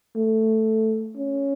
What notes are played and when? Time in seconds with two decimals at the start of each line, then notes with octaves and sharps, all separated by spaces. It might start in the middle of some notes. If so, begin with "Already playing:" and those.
0.16 A3
1.17 C#4